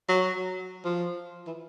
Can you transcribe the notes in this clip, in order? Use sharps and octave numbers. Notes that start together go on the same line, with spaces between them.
F#3
F3
E3